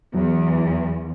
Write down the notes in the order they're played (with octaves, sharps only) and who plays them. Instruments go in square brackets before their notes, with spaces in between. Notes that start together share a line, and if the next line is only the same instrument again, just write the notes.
[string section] E2 [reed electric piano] F#3